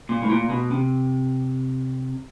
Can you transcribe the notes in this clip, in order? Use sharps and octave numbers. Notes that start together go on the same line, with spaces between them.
A#2
A2
A#2
B2
C3